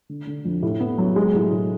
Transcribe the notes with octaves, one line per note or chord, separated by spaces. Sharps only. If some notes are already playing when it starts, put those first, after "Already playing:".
D3
D3
F2
A2
B3
F#3
G#3
A2
A2